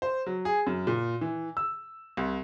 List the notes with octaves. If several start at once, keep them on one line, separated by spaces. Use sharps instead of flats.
C5
F#3
G#4
F#2
A#2
E3
E6
C2